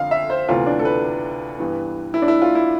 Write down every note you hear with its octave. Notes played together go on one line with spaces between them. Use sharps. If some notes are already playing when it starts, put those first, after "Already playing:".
Already playing: F2 D3 F5
E5
C5
D2 C3 E3 B3 F4
D4
A4
B4
G2 E3 B3
E4
D4
E4
F4
E4